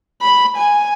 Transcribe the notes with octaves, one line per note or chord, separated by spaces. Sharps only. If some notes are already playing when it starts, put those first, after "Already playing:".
B5
G#5